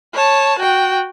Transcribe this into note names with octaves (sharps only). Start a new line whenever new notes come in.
C#5 A5
F#4 G5